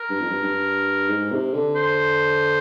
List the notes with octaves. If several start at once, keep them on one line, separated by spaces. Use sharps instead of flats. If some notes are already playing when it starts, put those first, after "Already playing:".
Already playing: A#4
G2
F2
G2
G2
G#2
C3
D3
C5